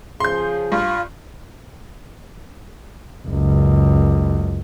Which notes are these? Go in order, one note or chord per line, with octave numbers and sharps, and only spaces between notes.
C#3 F3 G#4 C6 G6
G2 F4
F#1 C#2